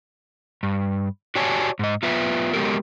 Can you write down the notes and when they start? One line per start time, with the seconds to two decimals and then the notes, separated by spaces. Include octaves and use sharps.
0.63 G2
1.35 F#4 G4 C#5 D5 G#5 A5
1.79 G#2 D#5
2.03 B3 F4 B4 E5
2.53 F#3 G#3 B3 G4 A4 A#4